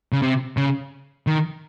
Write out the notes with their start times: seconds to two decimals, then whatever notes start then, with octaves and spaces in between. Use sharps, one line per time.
0.12 C#3
0.22 C3
0.57 C#3
1.27 D#3